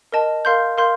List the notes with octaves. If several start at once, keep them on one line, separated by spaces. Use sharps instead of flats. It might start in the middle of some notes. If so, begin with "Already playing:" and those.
A#4 D#5 A5
A#4 F5 C6 G6
A#4 F5 C6 G6